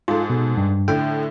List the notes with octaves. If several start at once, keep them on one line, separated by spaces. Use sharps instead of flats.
G#2 F4 A4
B2
G2
A2 D3 G5